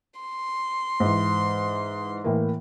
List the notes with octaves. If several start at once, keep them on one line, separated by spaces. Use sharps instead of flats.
C6
G#2 E3
A2 E3 A#3